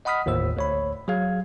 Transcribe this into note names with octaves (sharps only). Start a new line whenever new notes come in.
D#5 F#5 B5 D#6 F6 B6
G1 D#2 A2 C5 E6
D2 C#5 B5
F#3 G#4 F5 G#6